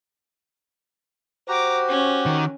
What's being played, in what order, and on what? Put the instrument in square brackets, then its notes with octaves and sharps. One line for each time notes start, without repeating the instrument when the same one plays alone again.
[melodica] F#4 G4 [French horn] C5 [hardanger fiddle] A#5 D6
[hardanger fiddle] C#4
[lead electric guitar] D#3